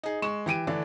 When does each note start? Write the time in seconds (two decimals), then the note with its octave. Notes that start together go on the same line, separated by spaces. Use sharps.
0.03 D#4 G#4
0.22 G#3 C#6 E7
0.46 E3 G4 D7 D#7
0.67 D3 E3 A3 D4